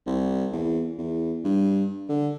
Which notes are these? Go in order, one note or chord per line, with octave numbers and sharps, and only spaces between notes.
C2
E2
E2
G2
D3